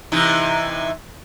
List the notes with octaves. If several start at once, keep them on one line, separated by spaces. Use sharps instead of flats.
C3 E3 D#4